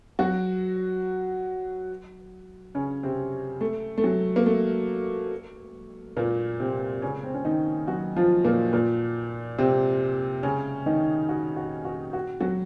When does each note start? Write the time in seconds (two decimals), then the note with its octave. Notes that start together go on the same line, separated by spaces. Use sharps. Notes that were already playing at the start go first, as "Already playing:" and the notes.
0.19 F#3 F#4
2.75 C#3 C#4
3.03 C3 C4
3.61 A3
3.98 A3
4.04 F#3
4.36 A#3
4.46 A3
6.17 A#2 A#3
6.60 C3 C4
7.02 C#3 C#4
7.24 C4
7.34 C#4
7.45 D#3 D#4
7.87 F#3 F#4
8.16 F3 F4
8.45 A#2 A#3
8.73 A#2 A#3
9.58 C3 C4
10.43 C#3 C#4
10.86 D#3 D#4
11.29 F#4
11.56 F#4
11.85 F#4
12.13 F#4
12.40 F#3 F#4